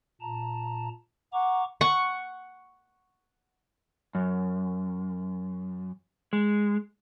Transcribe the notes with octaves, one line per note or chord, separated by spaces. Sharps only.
A#2 A5 A#5
F#5 A#5 C#6 D6
F#5 C#6
F#2
G#3